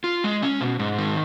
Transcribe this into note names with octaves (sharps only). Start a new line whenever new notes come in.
F4
G#3
C#4
B2
G#2
D#3